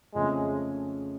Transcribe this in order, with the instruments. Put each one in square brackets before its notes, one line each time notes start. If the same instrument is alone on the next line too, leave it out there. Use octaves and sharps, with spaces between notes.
[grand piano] F2 C#3 F3 A3 C#4 [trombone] G#3